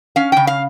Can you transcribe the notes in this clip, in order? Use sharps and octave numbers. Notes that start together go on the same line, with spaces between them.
C#4 F5
C#3 G5
F5